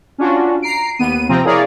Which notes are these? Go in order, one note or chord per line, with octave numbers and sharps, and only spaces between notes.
C#4 D4 F4 F#4
A#5 C7 D7
D#2 B3 D#7
C3 F3 C4 A#5
A#3 E4 G#4 A#4 C#5 D5